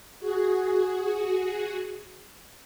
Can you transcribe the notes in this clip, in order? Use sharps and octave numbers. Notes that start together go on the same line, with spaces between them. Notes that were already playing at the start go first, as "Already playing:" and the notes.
F#4 G#4